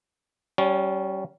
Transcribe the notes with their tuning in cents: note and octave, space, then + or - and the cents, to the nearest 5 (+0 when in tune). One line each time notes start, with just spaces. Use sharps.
G3 -30 C#4 +0